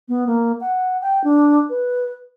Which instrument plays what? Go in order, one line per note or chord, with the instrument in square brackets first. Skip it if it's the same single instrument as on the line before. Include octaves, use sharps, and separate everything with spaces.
[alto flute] B3
A#3
F#5
G5
D4
B4